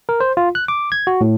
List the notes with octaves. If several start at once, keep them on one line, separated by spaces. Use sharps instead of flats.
A#4
C5
F4
F#6
D6
G#6
F#4
A2